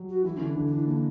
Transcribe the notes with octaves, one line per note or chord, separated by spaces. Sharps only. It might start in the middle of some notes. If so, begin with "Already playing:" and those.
Already playing: F#3 G3
F#4
E3 E4
D3 E3 C#4
D4
D3
D4
E3
D3 A#3